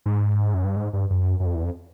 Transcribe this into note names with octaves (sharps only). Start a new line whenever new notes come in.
G#2
F#2
G2
G#2
G2
F#2
F#2
F2
E2
F2